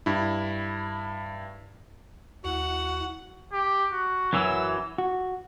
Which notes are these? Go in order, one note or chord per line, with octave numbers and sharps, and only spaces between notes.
G2 E4
D#2 E4 F#4 F#5
G4
F#4
F#2 E3 F#3 E6
F#4